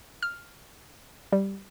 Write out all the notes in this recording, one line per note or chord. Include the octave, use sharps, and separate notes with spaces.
F6
G3